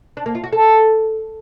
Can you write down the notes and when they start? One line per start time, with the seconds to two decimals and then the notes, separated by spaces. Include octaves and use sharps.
0.17 D4
0.26 A#3
0.35 F4
0.44 F#4
0.53 A4